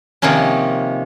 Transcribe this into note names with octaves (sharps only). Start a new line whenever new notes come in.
C3 D#3 F3 A#3 C#4